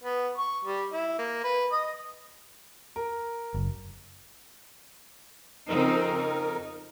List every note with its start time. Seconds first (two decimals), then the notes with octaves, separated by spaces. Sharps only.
0.03 B3
0.38 C#6
0.64 G3
0.93 E4
1.19 A#3
1.44 B4
1.72 D#5
2.96 A#4
3.54 F#1
5.68 F2 C#3 C4 D#4 A#4
6.15 D#4